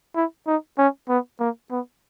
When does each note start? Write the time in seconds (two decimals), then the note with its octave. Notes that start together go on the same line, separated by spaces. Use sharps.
0.16 E4
0.47 D#4
0.78 C#4
1.09 B3
1.40 A#3
1.71 B3